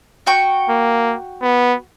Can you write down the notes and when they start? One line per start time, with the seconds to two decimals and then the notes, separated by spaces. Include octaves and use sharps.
0.27 F#4 G5 C#6
0.70 A#3
1.43 B3